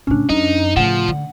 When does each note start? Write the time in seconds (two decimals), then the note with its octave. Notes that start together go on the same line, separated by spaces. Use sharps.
0.07 A2 C#3 C#4 D4
0.29 F#2 D#4
0.77 A2 C#3 F3 F#5
1.08 D3